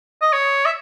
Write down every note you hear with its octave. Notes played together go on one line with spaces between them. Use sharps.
D#5
C#5
E5